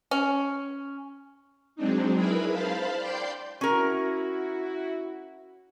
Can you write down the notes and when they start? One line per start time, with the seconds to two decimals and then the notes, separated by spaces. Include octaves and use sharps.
0.11 C#4
1.76 F#3 G#3 C4 D4 D#4
2.16 E4 G#4 A#4 B4 B5
2.51 C5 F5 A5 B5
2.97 D5 G5 C6 G6
3.61 C#4 E4 F#4 A#4